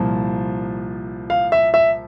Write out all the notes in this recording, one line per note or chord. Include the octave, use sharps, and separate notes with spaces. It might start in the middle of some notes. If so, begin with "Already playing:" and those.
Already playing: C2 A#2 F3
F5
E5
E5